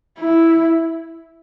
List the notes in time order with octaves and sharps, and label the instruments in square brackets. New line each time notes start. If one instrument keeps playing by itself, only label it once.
[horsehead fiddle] E4